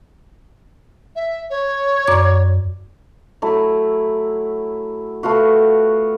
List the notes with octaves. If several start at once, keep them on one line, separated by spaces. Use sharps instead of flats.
E5
C#5
F#2 D5 D6
F#3 A3 E4
A3 B3 F4 F#4